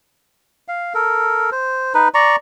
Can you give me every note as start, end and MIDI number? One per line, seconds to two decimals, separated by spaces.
0.68 0.93 77
0.94 1.50 69
0.94 1.50 70
1.52 1.93 72
1.94 2.09 63
1.94 2.09 71
2.14 2.36 74
2.14 2.36 82
2.14 2.36 85